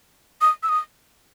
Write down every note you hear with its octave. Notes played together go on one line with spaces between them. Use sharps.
D#6
E6
D#6